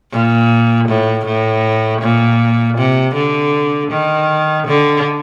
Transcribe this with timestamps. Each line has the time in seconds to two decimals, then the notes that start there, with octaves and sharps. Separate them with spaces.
0.11 A#2
0.88 A2
1.25 A2
2.01 A#2
2.77 C3
3.15 D3
3.91 D#3
4.67 D3